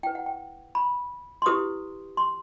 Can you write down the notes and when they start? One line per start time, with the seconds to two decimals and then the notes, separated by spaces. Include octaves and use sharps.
0.03 E4 B4 G5
0.15 F#5
0.26 G5
0.75 B5
1.42 C6
1.46 E4 G4 B4 D#6
2.17 C6